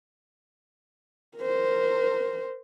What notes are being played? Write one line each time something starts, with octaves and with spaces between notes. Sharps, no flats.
A#4 C5